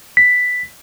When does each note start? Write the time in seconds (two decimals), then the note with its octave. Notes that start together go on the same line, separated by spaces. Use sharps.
0.17 B6